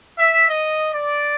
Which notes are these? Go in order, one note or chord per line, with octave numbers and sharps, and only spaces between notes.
E5
D#5
D5